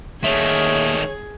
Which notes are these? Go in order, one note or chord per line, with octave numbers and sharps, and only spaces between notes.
D#2 D#3 A3 G#4 C#5 E5